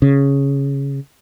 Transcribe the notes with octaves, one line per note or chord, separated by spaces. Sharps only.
C#3